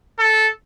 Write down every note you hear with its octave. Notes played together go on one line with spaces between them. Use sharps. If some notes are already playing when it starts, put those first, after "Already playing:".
A4